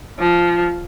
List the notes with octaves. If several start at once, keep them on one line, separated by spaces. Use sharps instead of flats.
F3